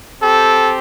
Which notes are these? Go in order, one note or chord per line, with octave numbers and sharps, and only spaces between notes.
C4 G4 A4